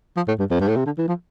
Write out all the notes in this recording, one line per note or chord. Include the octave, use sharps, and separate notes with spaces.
F3
A2
G2
F2
G2
A2
C3
D3
E3
F3